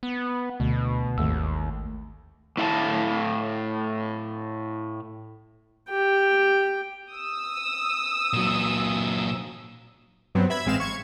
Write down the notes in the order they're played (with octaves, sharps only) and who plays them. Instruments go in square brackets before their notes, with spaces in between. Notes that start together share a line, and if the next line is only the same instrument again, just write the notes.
[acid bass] B3
[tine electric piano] D2 [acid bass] B2
[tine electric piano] G#1 A3 E6 [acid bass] D#2
[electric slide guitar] A2 E4 F5 F#5 A5
[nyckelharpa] G4 G5
[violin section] D#6 E6
[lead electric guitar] A#2 F#3
[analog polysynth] G2 F#3 B3 C4
E5 B5 G#6
A1 G#3 C4 F5 E7
C#6 G#6